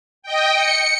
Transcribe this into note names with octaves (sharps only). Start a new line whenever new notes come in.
D#5 G5
C#7